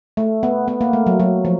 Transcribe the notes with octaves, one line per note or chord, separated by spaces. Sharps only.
A3
B3
B3
A#3
A3
F#3
F#3
F3